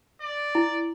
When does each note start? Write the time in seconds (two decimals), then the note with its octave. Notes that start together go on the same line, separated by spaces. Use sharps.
0.21 D5
0.55 E4